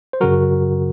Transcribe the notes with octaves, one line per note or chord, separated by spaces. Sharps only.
C5
F#2 C#3 F#3 F#4 A#4